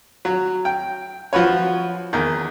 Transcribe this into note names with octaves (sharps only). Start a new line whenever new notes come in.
F#3
G5
F3 F#4 B4 C#5
E2 D#3